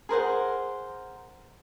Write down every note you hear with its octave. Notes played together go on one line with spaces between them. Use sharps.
G#4 A#4 C5 F#5